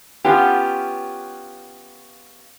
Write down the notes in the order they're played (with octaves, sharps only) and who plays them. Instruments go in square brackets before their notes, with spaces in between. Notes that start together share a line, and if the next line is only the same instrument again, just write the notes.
[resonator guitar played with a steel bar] B3 C#4 F4 G4